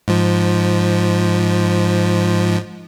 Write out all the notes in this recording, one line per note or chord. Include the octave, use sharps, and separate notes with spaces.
G#2 F3